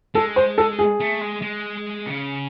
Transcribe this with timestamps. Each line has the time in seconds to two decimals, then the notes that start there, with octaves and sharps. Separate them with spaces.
0.15 G#3 A4
0.36 C5
0.58 A4
0.79 G#4
1.00 A3
1.21 G#3
1.42 G#3
2.06 C#3